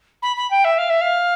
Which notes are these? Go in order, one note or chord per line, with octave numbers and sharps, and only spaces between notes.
B5
B5
G5
E5
F5
E5
F5